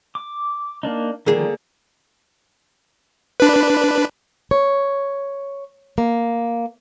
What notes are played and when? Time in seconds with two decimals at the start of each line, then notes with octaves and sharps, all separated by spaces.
0.15 D6
0.83 A#3 D4 D#4
1.26 D3 D#3 F3 G3 A#3 G#4
3.40 D4 B4
4.51 C#5
5.98 A#3